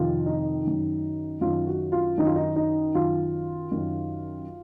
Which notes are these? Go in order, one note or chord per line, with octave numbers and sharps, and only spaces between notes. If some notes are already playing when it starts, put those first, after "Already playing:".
Already playing: F2 C3 D#3 F4
D#4
F#2 D#3
F#2 D#3 F4
F#4
F4
F#2 D#3 D#4
F4
D#4
D#4
F#2 D#3 F4
F#2 D#3